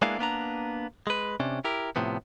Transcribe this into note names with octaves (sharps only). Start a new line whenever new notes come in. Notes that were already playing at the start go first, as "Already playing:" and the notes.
G#3 A#3 B3 D4 E4 F5
A#3 B3 D4 A#5
G#3 B4
C3 C#4 D4
E4 G4 A#4
A2 C3 F3 B3